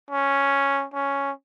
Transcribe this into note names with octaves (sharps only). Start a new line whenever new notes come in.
C#4
C#4